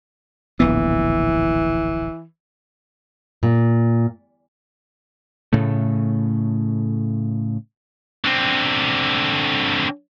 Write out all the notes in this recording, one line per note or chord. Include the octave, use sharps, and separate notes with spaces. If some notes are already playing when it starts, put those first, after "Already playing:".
D1 A#1 E3 B3
A#2
A2 C#3 A3
D3 C4